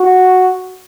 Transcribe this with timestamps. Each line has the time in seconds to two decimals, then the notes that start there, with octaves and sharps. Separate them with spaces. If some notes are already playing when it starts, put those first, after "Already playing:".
Already playing: F#4